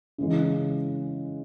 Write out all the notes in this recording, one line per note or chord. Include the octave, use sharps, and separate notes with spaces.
C#3 E3 G#3